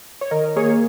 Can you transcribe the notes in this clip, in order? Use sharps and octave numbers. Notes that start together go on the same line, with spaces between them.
C#5
D#3 A#4 D#5
A#3 G#4 C#5